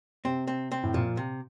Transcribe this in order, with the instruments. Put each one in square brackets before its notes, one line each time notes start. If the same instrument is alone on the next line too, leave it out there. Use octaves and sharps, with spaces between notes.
[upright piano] C3 [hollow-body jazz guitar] C4
[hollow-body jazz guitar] C4
C4
[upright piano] A2
[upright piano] A#2 [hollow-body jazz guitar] F3
[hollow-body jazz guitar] C3